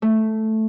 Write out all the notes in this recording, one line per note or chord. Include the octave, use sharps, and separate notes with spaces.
A3